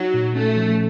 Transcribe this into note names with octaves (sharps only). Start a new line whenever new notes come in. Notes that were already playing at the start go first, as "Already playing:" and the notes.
Already playing: F#3 D#4 F#4
A#2
A3 C#4
F3